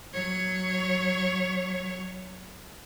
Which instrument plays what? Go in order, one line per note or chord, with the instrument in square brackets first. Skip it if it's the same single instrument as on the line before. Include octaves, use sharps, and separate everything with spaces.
[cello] F#3 C#5